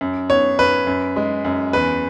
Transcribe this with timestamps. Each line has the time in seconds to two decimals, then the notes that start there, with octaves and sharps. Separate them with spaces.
0.01 F#2
0.30 B3 C#5
0.59 F#2 B4
0.87 F#2
1.16 G#3
1.45 F#2
1.73 E2 B4